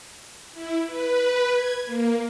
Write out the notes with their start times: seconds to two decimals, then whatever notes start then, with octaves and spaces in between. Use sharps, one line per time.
0.52 E4
0.87 B4
1.50 G#6
1.84 A#3